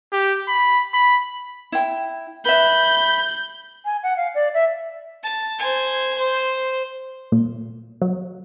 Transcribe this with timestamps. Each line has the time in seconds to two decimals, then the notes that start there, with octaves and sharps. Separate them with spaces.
0.12 G4
0.48 B5
0.94 B5
1.72 E4 G5
2.45 B4 E5 B5 G6
3.85 G#5
4.03 F#5
4.17 F5
4.35 D5
4.54 E5
5.23 A5
5.59 C5 G#5
6.18 C5
7.32 A#2
8.02 F#3